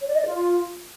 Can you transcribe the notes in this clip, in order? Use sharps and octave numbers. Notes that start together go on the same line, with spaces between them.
C#5
D5
D#5
D5
F4